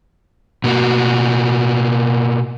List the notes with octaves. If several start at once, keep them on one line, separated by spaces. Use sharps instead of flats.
B2 A#3 F#4